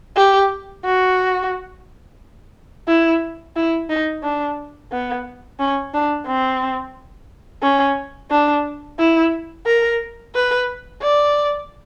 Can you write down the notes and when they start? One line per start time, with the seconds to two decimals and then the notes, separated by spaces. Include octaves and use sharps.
0.16 G4
0.85 F#4
2.88 E4
3.56 E4
3.90 D#4
4.23 D4
4.92 B3
5.60 C#4
5.94 D4
6.27 C4
7.63 C#4
8.31 D4
9.00 E4
9.66 A#4
10.35 B4
11.02 D5